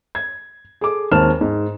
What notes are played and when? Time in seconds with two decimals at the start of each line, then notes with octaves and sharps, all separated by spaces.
0.15 G#6
0.81 G#4 A4 D6
1.11 D#2 G#3 C4 A5 F6 E7
1.41 G#2